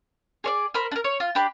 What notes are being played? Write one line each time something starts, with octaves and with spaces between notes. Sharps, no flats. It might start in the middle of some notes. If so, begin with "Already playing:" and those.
G#4 C#5 D5
A#4 C5 B5
D4 A#4
C#5
F4
D4 G4 B5